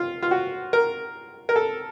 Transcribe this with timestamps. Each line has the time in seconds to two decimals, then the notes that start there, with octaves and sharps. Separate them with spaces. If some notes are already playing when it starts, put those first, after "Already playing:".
Already playing: F4
0.22 F4
0.31 F#4
0.73 A#4
1.49 A#4
1.56 A4